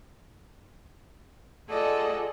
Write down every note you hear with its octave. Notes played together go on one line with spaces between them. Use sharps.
F4 G#4 A4 D5 D#5 F#5